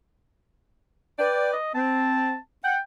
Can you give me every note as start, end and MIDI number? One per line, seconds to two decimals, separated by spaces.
1.19 1.55 71
1.19 1.55 74
1.19 1.52 79
1.53 1.72 75
1.75 2.35 60
1.75 2.37 81
2.64 2.76 78
2.64 2.80 79